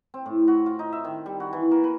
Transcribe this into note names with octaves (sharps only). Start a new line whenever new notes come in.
C4
A2
F#4
F4
D#4
E5
D#3
G3
F#4
E3
A#3
B4